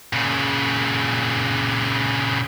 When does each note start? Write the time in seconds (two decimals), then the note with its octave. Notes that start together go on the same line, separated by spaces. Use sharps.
0.13 A#2 C#3